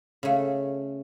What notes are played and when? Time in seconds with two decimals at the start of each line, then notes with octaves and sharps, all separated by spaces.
0.23 C#3 A3